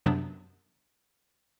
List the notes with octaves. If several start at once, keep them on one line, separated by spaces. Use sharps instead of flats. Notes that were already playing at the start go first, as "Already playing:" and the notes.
F#2 C3 F#3 B3 D4